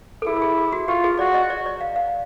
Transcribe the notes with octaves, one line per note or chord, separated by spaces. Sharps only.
A4
E4 G#4
A4
G#4
G#4
F#4
F4 G4
G#4
F#4 D5
D#5
D5
D5
F5
F5